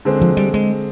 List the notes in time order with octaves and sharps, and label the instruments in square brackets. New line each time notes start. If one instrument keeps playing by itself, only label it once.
[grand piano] D3 G#3 C4
[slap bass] F3
G3
G#3